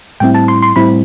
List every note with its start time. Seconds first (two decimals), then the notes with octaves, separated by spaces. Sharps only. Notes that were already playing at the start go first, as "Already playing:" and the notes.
0.20 A2 G3 C4 E4 G5
0.34 A5
0.48 C6
0.62 C6
0.76 A2 G3 C4 E4 B5